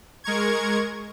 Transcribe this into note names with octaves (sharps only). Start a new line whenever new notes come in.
G#3 A#4 C#6 G#6